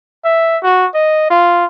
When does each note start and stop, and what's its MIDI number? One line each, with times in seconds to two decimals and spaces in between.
0.25 0.58 76
0.63 0.86 66
0.95 1.29 75
1.30 1.65 65